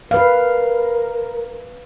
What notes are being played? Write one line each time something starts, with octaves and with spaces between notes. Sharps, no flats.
A#4 B4 F5